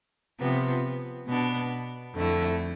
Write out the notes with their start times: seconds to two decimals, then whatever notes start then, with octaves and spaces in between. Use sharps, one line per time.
0.39 C3 F3 B3
1.27 B2 B3 D4
2.14 F2 D3 A3 E4